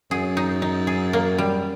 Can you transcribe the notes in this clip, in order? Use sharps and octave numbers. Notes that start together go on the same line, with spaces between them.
F#2 G#4
D#4
D#4
G#4
A#3
G3